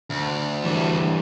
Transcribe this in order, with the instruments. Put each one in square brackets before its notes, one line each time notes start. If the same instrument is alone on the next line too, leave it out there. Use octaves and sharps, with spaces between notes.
[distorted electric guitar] D2
[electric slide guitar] E3 G3 D4